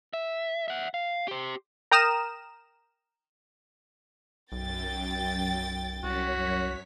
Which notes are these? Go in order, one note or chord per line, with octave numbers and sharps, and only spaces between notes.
E5
E5 F#5
F5
G4 C5
A#4 G5 A#5 D#6 F6 E7
B1 F#2 G5 A6
C2 F#2 F#4 C#5 B6